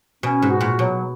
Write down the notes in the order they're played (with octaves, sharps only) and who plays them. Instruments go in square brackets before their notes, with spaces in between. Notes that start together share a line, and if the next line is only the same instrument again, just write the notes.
[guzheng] B2 [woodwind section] C#4
[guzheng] G#2
[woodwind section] F#4
[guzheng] A#2
[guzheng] B2 [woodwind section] F#3